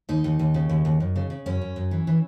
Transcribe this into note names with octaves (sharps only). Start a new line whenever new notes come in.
D#2 D#4
D#2
D#2
C#3
D#2
D#2
F#2
C#3
C#3
F#2 C#4
F#2
F#2
E3
E3